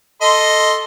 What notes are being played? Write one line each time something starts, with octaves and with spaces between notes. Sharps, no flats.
A4 D#5 C6